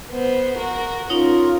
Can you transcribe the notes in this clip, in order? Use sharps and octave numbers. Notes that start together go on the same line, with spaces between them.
B3 C5
F#4 A#4
C#4 D#4 F4 A#4 C#5